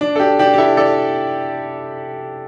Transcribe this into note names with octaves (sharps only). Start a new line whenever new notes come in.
D4
A4
D4 G4
D4 G4
G4
E4 A4
A4 D5